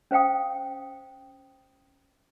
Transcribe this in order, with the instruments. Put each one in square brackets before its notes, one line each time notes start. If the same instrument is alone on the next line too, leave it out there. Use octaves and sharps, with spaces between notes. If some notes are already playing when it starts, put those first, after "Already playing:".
[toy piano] C#4 C5 F5 G5 D#6